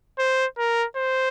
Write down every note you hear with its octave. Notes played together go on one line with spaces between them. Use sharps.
C5
A#4
C5